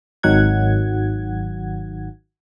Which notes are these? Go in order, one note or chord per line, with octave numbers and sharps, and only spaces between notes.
G#1 D#3 F#3 F#5 G#6